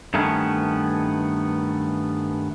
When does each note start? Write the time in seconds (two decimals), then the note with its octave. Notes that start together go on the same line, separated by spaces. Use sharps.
0.14 G2 D#3 A3 B3 C#4